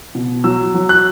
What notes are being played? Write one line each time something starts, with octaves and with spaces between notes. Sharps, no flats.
B2
F#3 E6
F#3
F#6